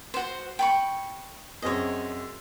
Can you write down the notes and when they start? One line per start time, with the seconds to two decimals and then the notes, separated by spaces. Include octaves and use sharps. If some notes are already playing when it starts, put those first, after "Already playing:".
0.14 F#4 C5
0.59 G5 B5 C#6
1.62 F#2 C4 G#4 C#5 D#5